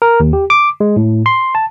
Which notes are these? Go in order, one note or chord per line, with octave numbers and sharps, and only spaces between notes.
A#4
D#2
G4
D6
G#3
A2
C6
A5